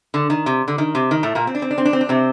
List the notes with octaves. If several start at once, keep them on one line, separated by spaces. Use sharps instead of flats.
D3
D#3
C3
D3
D#3
C3
D#3
A2 A3
A#2 A#3
C4
D4
C4
D4
C4
D4
C4
D4
C3 C4